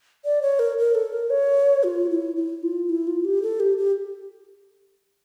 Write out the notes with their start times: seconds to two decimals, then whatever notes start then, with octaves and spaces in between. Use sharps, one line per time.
0.25 D5
0.42 C#5
0.59 A#4
0.78 A#4
0.95 A4
1.13 A#4
1.30 C#5
1.84 F4
2.10 E4
2.36 E4
2.63 F4
2.89 E4
3.07 F4
3.25 G4
3.42 A4
3.60 G4
3.78 G4